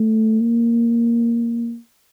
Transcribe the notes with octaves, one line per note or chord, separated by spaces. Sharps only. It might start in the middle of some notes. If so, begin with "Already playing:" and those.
Already playing: A3
A#3